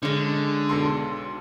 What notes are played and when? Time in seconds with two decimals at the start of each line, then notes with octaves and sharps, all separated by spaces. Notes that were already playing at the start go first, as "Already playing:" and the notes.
0.03 D3 G#3 C#4
0.69 B1 A4 C6